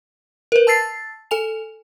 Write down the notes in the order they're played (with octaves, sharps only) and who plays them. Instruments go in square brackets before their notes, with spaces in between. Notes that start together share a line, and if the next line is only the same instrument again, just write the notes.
[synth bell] A#4 B4
A5 E6 A6 C7
A4 G#5 F7